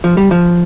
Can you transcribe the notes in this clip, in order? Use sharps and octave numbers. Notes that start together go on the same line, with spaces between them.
F3
G3
F3